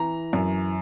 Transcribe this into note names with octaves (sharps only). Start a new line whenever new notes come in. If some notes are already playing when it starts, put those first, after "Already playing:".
Already playing: E3 A#5
F#2